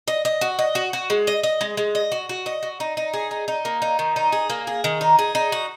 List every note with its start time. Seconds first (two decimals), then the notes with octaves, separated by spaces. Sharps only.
0.08 D#5
0.25 D#5
0.41 F#4
0.59 D#5
0.75 F#4
0.93 F#4
1.10 G#3
1.27 D#5
1.43 D#5
1.61 G#3
1.77 G#3
1.95 D#5
2.12 F#4
2.29 F#4
2.46 D#5
2.63 F#4
2.80 D#4
2.97 D#4
3.14 G#4
3.31 D#4
3.48 D#4
3.65 A#3
3.82 D#4
3.99 D#3
4.16 D#4
4.32 G#4
4.50 A#3
4.67 G#4
4.84 D#3
5.01 D#4
5.19 G#4
5.35 D#4
5.52 F#4